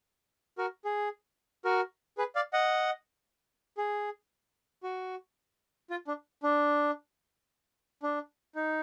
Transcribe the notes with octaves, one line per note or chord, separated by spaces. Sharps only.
F#4 A#4
G#4
F#4 A#4
G#4 B4
D5 F5
D#5 F#5
G#4
F#4
F4
D4
D4
D4
D#4